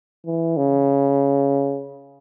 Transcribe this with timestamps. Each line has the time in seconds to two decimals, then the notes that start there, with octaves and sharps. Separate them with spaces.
0.26 E3
0.57 C#3